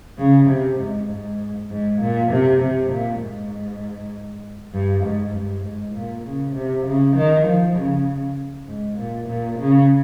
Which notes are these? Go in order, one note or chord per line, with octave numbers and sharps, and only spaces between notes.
C#3
C3
G#2
G#2
G#2
A#2
C3
C3
A#2
G#2
G2
G#2
G2
G#2
A#2
C#3
C3
C#3
D#3
F3
C#3
G#2
A#2
A#2
C#3